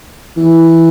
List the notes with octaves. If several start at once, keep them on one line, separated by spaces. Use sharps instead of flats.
E3